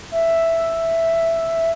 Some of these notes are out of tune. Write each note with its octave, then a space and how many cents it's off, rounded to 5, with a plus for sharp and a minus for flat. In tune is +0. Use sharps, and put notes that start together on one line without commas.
E5 +5